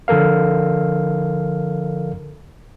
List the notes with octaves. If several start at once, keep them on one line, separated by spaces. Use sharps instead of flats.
D3 F3 A4 A#4 F5